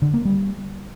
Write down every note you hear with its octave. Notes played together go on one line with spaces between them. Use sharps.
D3
A#3
G3